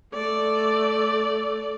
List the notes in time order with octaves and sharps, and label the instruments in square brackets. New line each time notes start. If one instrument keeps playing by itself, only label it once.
[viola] A3 D5